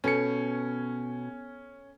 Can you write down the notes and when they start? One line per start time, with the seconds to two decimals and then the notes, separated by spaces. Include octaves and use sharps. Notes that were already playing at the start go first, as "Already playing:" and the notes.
0.04 B2 C#4 A4 G#5 C#7